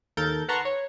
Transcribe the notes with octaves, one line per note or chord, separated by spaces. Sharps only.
D#2 A4 A#4 G6 A6
B4 F#5 A5 A#5 C6 C#6
C#5